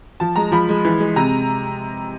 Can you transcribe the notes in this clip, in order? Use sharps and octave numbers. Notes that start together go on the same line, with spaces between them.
F3 A5
G#3 A#5
F3 B5
G#3
E3
G#3
C3 A#5